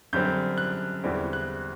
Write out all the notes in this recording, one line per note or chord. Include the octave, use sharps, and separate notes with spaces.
F#2 D3 G3 C4 G6
F#6
E2 D3 G3 C4 E4
F#6